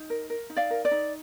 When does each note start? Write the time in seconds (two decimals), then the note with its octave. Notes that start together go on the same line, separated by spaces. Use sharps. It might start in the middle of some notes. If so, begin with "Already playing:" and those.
Already playing: D#4
0.10 A#4
0.30 A#4
0.50 D#4
0.56 D5 F5
0.70 A#4
0.85 D5
0.91 D#4